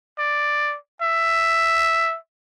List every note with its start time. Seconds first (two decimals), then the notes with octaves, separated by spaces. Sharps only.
0.18 D5
1.01 E5